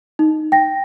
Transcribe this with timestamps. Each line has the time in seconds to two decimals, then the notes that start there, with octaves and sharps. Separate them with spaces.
0.19 D#4
0.52 G5 A#6